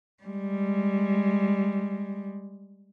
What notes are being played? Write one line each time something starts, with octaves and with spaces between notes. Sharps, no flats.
G3 G#3